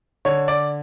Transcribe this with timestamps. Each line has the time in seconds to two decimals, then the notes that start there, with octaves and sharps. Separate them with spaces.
0.25 D3 C#5
0.48 D5